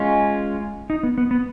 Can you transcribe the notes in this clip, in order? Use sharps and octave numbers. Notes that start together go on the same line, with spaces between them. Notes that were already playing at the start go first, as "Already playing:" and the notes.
Already playing: G#3 C#4 F4
D#4
B3
B3
B3